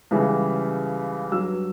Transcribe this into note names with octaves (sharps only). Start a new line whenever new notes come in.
C#2 C#3 E3 G3
G2 F#3 E6